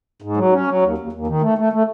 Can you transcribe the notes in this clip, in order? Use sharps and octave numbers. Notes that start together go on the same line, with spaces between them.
G#2
F#3
C#4
F#3
D#2
D#2
D#2
D#3
A3
A3
A3